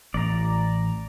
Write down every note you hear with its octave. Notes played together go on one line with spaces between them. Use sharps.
A1 D5 A#5